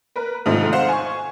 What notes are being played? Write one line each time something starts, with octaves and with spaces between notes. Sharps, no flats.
A#4 B4
G#2 C3 D#3 F3 A3
C5 F5 F#5
G#5 C#6